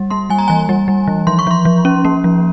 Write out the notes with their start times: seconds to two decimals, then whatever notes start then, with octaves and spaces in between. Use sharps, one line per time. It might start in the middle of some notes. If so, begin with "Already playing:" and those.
Already playing: G3
0.10 A#3 C6
0.30 G3 G#5
0.38 A#5
0.48 E3 G#5
0.69 G3
0.88 G3
1.07 E3
1.27 F3 C6
1.39 C#6
1.47 F3 C6
1.65 F3
1.85 C#4
2.05 A#3
2.24 F3